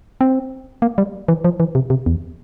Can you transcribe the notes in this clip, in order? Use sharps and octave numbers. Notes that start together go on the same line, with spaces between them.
C4
A#3
G3
E3
F3
E3
C3
C3
E2